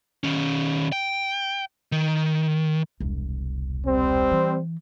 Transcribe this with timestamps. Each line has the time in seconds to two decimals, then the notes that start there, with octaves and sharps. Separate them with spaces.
0.23 D#3 C#4
0.92 G5
1.92 D#3
3.00 E1 C2
3.85 G3 C4
4.31 E3